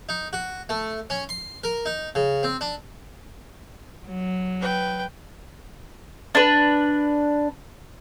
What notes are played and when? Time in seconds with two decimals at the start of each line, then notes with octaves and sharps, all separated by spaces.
0.09 D#4
0.33 F#4
0.69 A3
1.10 C#4
1.29 C6
1.64 A#4
1.86 D#4
2.15 C#3
2.43 C4
2.61 D4
4.06 F#3
4.60 B4 G5
6.35 D4 B4